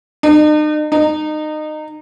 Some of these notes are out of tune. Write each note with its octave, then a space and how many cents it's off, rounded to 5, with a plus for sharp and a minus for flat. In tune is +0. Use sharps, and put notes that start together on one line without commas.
D#4 -45
D#4 -25